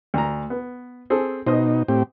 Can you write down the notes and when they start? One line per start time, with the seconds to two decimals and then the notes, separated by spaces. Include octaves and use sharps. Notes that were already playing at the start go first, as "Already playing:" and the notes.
0.14 D2 A#5
0.50 B3
1.10 C4 G#4 A4
1.47 B2 D#4 C5 D#5 D#6
1.88 A2 C4 G4